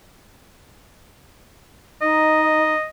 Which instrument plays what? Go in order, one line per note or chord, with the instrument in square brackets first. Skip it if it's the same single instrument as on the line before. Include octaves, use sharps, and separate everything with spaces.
[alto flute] D#4 [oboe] D#5